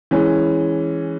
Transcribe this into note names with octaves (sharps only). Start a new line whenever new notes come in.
E3 G#3 C#4